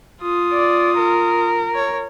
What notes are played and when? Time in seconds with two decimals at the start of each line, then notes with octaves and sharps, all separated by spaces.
0.21 F4 D#6
0.53 D5
0.98 A#4
1.75 C#5